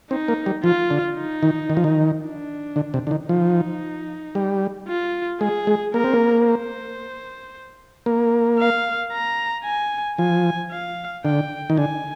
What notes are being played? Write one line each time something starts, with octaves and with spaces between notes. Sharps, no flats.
C4 D#4
A#3
G3
F3 F4
D3
D#4
D#3
D#3
F3
D#3
D4
D3
C3
D3
D#3
F3 D#4
G3
F4
G#3 G#4
G#3
A#3 A#4
C4
A#3
C5
A#3
F5
A#5
G#5
F3 G#5
F5
D3 G5
D#3
D3 G#5